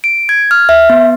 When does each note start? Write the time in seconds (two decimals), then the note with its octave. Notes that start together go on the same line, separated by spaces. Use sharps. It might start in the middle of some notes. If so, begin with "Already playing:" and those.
0.04 D7
0.29 G#6
0.51 F6
0.69 E5
0.90 B3